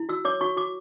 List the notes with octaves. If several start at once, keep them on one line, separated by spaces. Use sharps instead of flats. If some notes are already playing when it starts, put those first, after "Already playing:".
Already playing: E4
F#4 E6
C#5 D6
F#4 C#6
F#4 D6